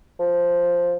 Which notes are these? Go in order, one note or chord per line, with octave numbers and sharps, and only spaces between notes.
F3